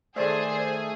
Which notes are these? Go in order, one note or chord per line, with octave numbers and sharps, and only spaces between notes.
D#3 A3 G#4 C5 D5